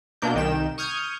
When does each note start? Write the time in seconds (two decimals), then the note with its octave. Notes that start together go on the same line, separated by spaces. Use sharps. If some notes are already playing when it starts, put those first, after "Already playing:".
0.22 B2 A#3 D4 G6
0.35 C2 D#3 G5 E7
0.78 C#6 D#6 F6 G6 G#6